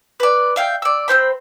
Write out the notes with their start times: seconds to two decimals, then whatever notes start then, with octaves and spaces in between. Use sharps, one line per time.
0.20 B4 D5
0.56 E5 F5 G5
0.82 D5 E6
1.08 C4 C#4 C5 B5